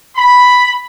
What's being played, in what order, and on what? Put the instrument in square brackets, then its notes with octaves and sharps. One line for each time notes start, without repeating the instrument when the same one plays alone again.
[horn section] B5